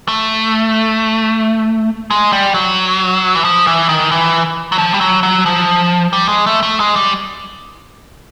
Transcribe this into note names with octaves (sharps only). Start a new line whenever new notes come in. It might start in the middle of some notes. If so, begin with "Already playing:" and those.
A3
G#3
G3
F#3
E3
F3
E3
D#3
E3
F#3
F3
G3
F#3
F#3
F3
G3
G#3
A3
A3
G#3
G3